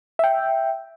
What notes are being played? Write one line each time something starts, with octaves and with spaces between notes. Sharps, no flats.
E5 G5